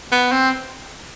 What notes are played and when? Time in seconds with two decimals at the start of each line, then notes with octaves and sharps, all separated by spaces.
0.12 B3
0.32 C4